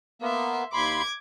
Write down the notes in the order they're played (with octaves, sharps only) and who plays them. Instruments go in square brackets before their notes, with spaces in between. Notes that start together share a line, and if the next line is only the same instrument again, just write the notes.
[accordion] A#3 B3 [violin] E5 C6
[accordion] D#2 B5 C6 [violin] D6 G#6